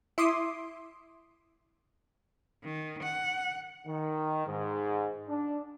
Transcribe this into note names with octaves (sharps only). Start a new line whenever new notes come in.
E4 E5 C6 D6 D#6
D#3
F#5
D#3
G#2
D4